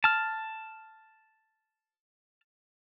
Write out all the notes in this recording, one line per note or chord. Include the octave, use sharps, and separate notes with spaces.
A5 F6